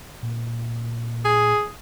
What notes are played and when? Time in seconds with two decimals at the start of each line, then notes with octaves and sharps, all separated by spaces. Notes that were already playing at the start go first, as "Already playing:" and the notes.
0.23 A#2
1.25 G#4